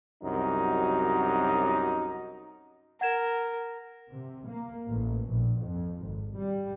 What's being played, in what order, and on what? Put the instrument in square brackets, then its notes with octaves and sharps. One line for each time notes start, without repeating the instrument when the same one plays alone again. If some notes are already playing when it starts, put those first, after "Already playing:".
[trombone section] C2 F#2 F#3 D#4
[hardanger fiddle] A#4 [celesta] F#5 G#6 E7
[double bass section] C3
A#3
A1
A#1
F2
G#1
G3